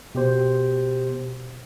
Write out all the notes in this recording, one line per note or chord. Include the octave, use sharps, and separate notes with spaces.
B2 G4 C5